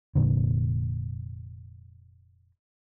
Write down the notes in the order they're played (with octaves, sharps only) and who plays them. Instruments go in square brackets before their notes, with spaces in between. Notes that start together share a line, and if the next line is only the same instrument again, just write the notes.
[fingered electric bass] F1 B1 A#2 D3